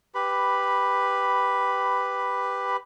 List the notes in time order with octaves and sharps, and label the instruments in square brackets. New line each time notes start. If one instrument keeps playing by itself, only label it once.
[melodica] G4 B4 B5